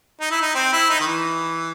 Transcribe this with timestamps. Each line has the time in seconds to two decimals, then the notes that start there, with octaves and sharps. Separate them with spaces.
0.21 D#4
0.31 E4
0.42 D#4
0.55 C4
0.73 E4
0.89 D#4
1.00 D#3
1.07 E3